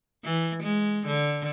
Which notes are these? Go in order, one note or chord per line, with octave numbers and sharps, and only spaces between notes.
E3
G#3
D3